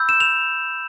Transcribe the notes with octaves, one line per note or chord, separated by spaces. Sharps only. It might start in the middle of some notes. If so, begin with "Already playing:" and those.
Already playing: B5 E6 G6
E7
F7